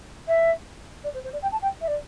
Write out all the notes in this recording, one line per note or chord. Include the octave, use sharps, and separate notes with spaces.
E5
D5
C5
C5
D5
G5
A5
G5
E5
D5